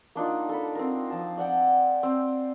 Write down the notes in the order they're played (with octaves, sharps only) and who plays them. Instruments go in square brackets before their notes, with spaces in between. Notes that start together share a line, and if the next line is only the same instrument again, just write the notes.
[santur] A#3 D4 D#4 F4
A4 B5
C4 A#4
F3 A5
D5 F#5 G5
C4